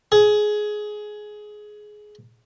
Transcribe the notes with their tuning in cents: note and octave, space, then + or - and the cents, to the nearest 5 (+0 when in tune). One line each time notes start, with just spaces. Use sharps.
G#4 +15